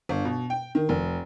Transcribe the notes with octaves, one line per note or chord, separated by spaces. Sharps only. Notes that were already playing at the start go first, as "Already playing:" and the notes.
G1
B2
G5
D#3
F1